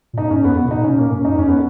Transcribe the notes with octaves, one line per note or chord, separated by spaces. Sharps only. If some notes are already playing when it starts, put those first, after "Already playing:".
A#2
G#2 D#4
G#2 C#4
F2 B3
B3
B2
A#2 D#4
B2 C#4
A#2 A#3
G#2 C#4
F#2 D#4
F2 C#4
B3